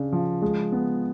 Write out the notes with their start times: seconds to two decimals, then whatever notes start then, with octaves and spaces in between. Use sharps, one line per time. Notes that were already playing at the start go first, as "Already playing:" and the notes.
Already playing: C#3 D4
0.12 F3
0.42 G#3
0.72 B3